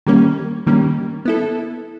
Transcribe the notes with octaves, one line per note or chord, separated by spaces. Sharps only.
D#3 G3 A#3 C#4
D#3 G3 A#3 C#4
B3 E4 A4